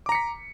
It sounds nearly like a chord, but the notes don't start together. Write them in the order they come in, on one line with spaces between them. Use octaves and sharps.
D6 A#5 C#7 B6